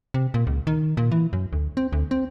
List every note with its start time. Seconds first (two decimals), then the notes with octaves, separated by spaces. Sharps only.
0.14 C3
0.34 A#2
0.47 C#2
0.67 D#3
0.97 A#2
1.12 E3
1.33 F#2
1.53 D2
1.77 C4
1.92 D2
2.11 C4